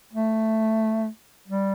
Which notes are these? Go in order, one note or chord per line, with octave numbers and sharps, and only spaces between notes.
A3
G3